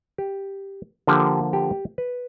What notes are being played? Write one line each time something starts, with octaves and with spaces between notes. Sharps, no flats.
G4
D3 F3 A#3 G4
G4
B4